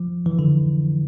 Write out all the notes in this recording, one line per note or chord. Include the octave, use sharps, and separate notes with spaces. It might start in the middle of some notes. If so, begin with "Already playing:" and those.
Already playing: F3
E3
D3